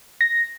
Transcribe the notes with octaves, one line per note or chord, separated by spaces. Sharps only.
A#6